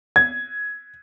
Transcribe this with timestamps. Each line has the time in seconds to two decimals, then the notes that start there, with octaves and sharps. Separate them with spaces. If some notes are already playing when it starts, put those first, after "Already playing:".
0.16 G#6